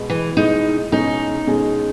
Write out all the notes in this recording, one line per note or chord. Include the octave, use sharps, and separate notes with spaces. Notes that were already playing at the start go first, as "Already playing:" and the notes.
Already playing: B2 G#3 B3
E3
B2 G#3 B3 D#4
B2 G#3 C#4 D#4 G#4
B2 G#3 C#4 G#4